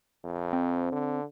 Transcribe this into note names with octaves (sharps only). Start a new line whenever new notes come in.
F2
C4
D3